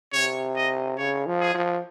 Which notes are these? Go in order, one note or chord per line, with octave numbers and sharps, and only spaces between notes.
C3 C#5
D#5
C#3 C#5
F3
G#4
F3